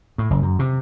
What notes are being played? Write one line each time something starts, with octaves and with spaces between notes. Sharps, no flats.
A2
F#1
F#2
C3